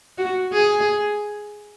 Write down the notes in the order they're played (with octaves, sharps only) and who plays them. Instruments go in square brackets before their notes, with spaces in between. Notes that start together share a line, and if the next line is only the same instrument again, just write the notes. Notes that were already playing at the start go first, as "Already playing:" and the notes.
[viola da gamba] F#4
G#4